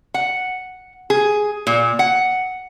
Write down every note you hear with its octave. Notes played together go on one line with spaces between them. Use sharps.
F#5
G#4
A#2
F#5